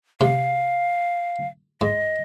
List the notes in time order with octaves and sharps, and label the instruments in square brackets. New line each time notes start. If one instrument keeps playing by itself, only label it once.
[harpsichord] C3 [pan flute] F5
[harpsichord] G#2 [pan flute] D#5